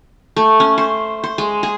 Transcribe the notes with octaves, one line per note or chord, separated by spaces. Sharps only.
A3
C#4
C5
C5
G#3
G#4